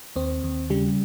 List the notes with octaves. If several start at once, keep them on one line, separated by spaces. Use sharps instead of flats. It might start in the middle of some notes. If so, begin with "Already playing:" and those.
D#2 C4
D#2
C#3 G3